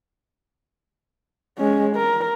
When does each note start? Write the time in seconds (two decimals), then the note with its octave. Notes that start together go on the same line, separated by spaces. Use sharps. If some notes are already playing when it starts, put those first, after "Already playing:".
1.58 G#3 C#4
1.96 A#4